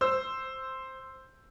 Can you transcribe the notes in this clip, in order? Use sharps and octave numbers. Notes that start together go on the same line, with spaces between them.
C5 E6